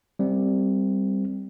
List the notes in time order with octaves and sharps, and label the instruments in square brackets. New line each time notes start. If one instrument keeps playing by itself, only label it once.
[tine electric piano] G3 C4